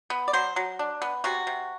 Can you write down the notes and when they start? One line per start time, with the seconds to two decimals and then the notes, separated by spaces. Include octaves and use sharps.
0.10 B3
0.28 D5
0.33 F#3 C5
0.56 F#3
0.79 D4
1.02 B3
1.24 C3 F#4
1.47 C3